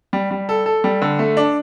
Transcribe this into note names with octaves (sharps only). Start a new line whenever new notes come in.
G3
G3
A4
A4
G3
D3
A3
D4